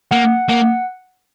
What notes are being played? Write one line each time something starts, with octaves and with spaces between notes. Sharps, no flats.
A#3 F#5
A#3 F#5